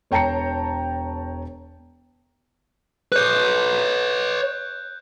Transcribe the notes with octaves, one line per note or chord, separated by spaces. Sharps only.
E1 C#5 G5 A5 A#5 C#7
B4 C#5 F#6 G6